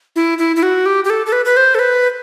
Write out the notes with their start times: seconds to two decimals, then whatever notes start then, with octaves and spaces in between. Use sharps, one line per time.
0.16 E4
0.38 E4
0.56 E4
0.63 F#4
0.86 G4
1.04 G4
1.10 A4
1.26 A4
1.32 B4
1.45 B4
1.57 C5
1.75 A4
1.79 B4